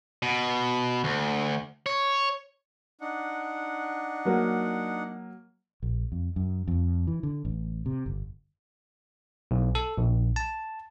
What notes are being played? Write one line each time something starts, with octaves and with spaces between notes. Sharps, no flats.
B2
D2
C#5
D4 D#4 F#5
F#3 A#3
A#1
F2
F#2
F2
E3
D3
A1
C3
G1
B1
A4
A#1
A5